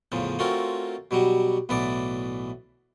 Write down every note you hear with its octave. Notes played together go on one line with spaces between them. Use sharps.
E2 A2 C#3 F3
A3 C4 C#4 F4 F#4 A#4
B2 F#3 G3 F#4
B1 A2 E3 B3 D5